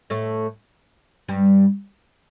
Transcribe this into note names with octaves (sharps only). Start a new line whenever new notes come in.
A2 A3
G2 G3